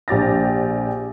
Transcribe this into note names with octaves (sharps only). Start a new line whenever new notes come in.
A#1 G4 A6 A#6